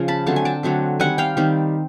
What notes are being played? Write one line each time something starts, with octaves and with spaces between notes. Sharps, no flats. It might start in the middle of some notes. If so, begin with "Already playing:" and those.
Already playing: C#3 F3
A5 B5
D3 F#3 A3 C4 A5
G#5
G5 A5
D3 F#3 A3 C4
D#3 G3 C4 F#5 G#5
F5 G5
D#3 G3 C4